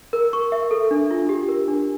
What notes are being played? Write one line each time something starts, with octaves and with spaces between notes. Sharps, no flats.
A#4
C#6
E5
A4
D4
F4
G4
A#4
D4